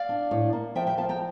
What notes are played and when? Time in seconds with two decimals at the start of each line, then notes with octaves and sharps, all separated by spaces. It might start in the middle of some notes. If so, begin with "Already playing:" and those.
Already playing: D5 F5
0.09 D4
0.31 A2
0.53 A#3
0.75 F3 E5 G5
0.87 E5 G5
0.97 F3 F5 A5
1.09 G5 A#5